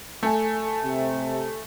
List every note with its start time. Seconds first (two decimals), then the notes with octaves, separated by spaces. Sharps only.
0.23 A3 A4 G#5
0.84 C3